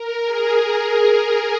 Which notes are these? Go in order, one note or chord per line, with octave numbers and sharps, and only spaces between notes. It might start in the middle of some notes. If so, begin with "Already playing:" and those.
Already playing: A#4
G#4